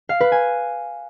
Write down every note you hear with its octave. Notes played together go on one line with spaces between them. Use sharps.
F5
B4
G#5